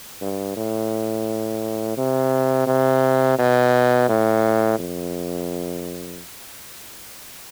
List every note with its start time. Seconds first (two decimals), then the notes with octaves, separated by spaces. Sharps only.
0.21 G2
0.56 A2
1.97 C3
2.67 C3
3.38 B2
4.09 A2
4.79 F2